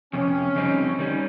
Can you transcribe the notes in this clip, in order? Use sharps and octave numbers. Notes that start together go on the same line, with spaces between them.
F2 C3 C#4
F2 C#3 G3 C4 D#4
D#3 G3 C#4